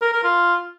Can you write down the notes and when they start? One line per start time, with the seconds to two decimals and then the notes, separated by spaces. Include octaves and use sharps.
0.02 A#4
0.13 A#4
0.24 F4